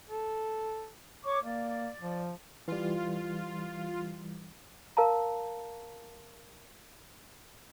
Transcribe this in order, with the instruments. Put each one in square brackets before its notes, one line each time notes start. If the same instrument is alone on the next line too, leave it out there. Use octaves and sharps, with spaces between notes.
[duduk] A4
[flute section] C#5 C#6 D6
[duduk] A#3 [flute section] D5
[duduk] F3
[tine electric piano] E3 G3 [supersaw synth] F4
[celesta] A#4 F5 A5 A#5